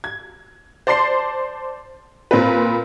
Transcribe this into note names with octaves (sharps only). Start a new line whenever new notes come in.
G#6
C5 D5 A5 C6 C7
A#2 C4 B4